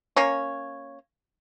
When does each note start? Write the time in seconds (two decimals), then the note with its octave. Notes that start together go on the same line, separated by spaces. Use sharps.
0.17 A#3 C#4 C#5